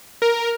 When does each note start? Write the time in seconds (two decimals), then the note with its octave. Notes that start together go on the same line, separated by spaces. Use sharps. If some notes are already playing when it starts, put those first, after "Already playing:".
0.22 A#4